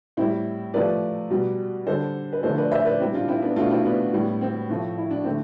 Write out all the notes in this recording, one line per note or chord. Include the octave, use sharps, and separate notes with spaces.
A2 G3 C4 E4
C3 F3 A3 B4 D5
B2 G3
D3 G3 A4 C5
B4
D3 F3 A3 A4 C5
B4 D5
C5 E5
B4 D5
C3 G3 C4 E4
D4 F4
C4 E4
B3 D4
B2 A3 D4 F4
C4 E4
B3 D4
A2 G3
C4
A2 F3 A3
E4
D4
D3 A3 C4